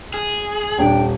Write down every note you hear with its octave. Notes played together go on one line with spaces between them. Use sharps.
G#4
D#1 D4 G5